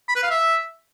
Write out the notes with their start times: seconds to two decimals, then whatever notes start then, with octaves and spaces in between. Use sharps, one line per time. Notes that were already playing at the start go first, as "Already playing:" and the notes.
0.08 B5
0.15 B4
0.23 F5
0.30 E5